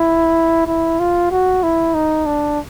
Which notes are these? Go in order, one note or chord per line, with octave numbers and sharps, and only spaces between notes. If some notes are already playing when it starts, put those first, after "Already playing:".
Already playing: E4
E4
F4
F#4
E4
D#4
D4